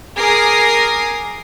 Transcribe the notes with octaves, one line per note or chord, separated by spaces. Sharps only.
G#4 A#4 D6 D#6 A#6 C7